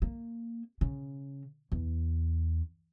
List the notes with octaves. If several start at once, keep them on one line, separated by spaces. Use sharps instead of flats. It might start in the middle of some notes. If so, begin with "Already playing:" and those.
A#3
C#3
E2